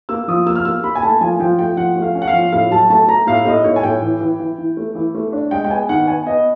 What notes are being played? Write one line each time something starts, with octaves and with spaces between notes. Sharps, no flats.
A#3 E6
F3 D#6
A#3 E6
F6
A#3 E6
A#3 B5
G#5
A3 A5
F3 G#5
F3 G5
A3 G5
F3 F#5
A3
F5
C#4
F#5
F5
F3
A2 F5
F#3 A5
A3 A5
A3 A#5
A2 F5
A2 D#5
A2 C#5
G#5
A2 G5
E3
E3
E3
E3
A3
E3
A3
D4
G#3 G5
G5
B3 G#5
D#3 F#5
B3 G#5
B3 D#5